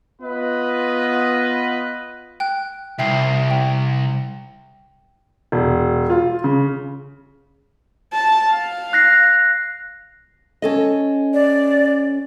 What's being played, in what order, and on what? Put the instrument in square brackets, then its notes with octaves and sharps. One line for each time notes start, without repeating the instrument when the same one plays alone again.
[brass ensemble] B3 F4 B4 D#5
[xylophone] G5 F#6
[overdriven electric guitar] C2 [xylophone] E5 G5 C7
[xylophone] G5
[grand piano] E1
F4
C#3
[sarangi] A5
F5
[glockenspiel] F#6 A#6 C7
[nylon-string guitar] C#4 A4 D#5
[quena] D5